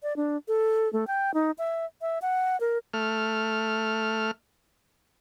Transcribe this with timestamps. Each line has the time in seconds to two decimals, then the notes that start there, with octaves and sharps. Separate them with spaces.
0.03 D5
0.16 D4
0.48 A4
0.93 A3
1.07 G5
1.34 D#4
1.58 E5
2.01 E5
2.22 F#5
2.60 A#4
2.94 A3 F6